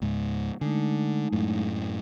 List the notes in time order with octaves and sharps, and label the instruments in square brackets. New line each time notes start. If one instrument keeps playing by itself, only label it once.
[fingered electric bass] C#2 G#2
[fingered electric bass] D3 [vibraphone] G#3 A3 D#4
[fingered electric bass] F#2 A2